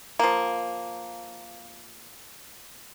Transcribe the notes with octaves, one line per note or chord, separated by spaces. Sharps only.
F3 A#3